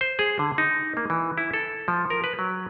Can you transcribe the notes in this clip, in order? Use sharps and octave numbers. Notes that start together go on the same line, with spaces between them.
C5
G#4
D3
D#4
A#3
E3
E4
A4
F3
A#4
B4
F#3